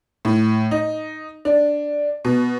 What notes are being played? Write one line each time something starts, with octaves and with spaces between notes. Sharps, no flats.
A2
D#4
D4
B2